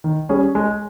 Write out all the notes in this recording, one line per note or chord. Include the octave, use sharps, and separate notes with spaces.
D#3
G3 C#4 G#4
G#3